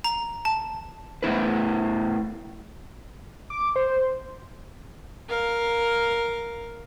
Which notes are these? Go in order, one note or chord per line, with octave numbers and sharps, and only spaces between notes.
A#5
A5
A2 B3 E4 B4
D6
C5
A#4 F5